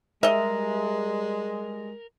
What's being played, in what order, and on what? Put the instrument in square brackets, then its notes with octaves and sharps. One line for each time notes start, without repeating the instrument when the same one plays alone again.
[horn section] G3 G#3 [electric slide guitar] A#4 [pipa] D#5 E5